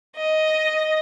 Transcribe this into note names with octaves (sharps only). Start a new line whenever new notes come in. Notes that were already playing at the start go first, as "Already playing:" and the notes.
D#5